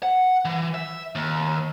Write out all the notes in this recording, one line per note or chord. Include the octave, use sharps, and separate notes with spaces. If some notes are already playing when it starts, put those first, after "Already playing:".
F#5
E3
E5
D#2